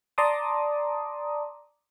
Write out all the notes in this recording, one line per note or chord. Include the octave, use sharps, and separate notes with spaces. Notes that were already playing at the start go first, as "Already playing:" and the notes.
D5 A5 A#5 C6 D6 D#6